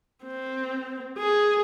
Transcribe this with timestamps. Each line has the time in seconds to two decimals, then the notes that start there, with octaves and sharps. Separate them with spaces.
0.25 C4
1.18 G#4